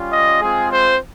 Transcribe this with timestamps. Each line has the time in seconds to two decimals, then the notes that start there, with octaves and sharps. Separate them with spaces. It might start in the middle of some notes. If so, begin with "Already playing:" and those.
Already playing: G3 C#4 F4
0.11 D#5
0.41 G#3 C4 F4 G#4
0.70 C5